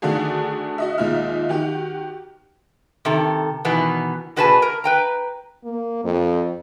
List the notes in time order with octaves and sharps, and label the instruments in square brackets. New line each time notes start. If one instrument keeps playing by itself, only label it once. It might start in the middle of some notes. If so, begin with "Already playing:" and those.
[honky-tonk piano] D3 D#3 A3 D4 F#4 G#4
F#4 D#5 E5
D#2 A#2 G#3 D#4 E5 F6
D#3 F#4 G4
[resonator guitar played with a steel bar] C3 D#3 A4
B2 D#3 E3 B3
B2 F#4 G#4 B4 G#5 A5
A#4
B4 G5 A#5
[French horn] A#3
F2